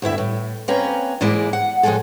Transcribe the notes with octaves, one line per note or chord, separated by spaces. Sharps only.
D2 G2 E4 E5
A2
A#3 C4 C#4 B4 A#5
G#2 E3 G#3 A#3 E4 D5
F#5
A2 F3 F#3 G#3 G#4 A4